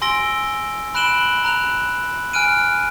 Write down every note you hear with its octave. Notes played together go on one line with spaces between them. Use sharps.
G#5 C6 E6 A#6 D7 G7
B5 F#6 D7 E7 F#7 G7
A#5 F#6 F7
G#5 F6 F#6 D7 D#7